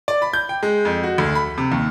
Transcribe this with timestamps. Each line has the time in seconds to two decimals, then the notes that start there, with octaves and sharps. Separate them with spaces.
0.08 D5
0.22 B5
0.33 G6
0.49 G5
0.63 G#3
0.85 F2
1.03 F#4
1.18 D2
1.35 B5
1.58 C3
1.72 D#2